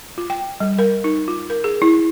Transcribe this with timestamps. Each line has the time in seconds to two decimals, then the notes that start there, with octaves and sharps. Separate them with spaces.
0.18 F4
0.30 G5
0.60 G3
0.79 A#4
1.04 D#4
1.28 F4
1.50 A#4
1.64 G#4
1.82 E4